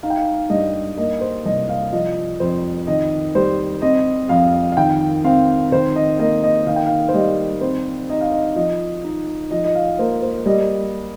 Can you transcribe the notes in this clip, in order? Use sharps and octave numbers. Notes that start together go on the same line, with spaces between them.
D#4 F5
G5
F5
G2 D#5
A#3 D#5
C5
C2 D#5
F5
F3 D#5
F2 C5
D#3 D#5
G3 C5
C4 D#5
F2 F5
F5
D#3 G5
C4 F5
D#3 C5
D#5
A#3 D#5
D#5
D#3 F5
G5
F5
C5
G3 D#5
C4 C5
D#4 D#5
F5
D#5
F3 D#5
D#4
F3 D#5
D#5
F5
A#3 C5
C5
G3 D#5